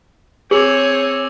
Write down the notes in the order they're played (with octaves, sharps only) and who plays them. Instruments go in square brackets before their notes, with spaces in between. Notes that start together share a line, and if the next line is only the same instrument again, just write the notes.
[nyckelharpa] C4 G#5 [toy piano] G#4 [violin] C#5 [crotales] D6 E6 F#7